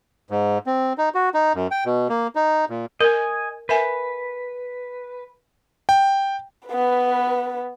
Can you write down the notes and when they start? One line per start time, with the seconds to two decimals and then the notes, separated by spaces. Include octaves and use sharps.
0.30 G#2
0.66 C4
0.98 D#4
1.15 F#4
1.34 D#4
1.55 F#2
1.71 G5
1.85 B2
2.09 A#3
2.35 D#4
2.70 A#2
3.00 A#4 D#5 G#5
3.69 A#4 B4 E5 G#5
5.89 G5
6.68 B3 B4